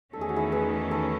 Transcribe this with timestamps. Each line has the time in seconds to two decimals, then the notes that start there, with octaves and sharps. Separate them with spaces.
0.13 E2 D#3 A3 C#4 A4
0.21 G#4
0.29 F#4
0.36 E4 G#4
0.52 G#4 B4
0.91 A4 C#5